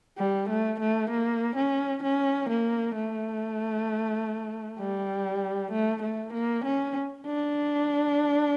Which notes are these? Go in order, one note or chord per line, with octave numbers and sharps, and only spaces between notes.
G3
A3
A3
A#3
C#4
C#4
A#3
A3
G3
A3
A3
A#3
C#4
D4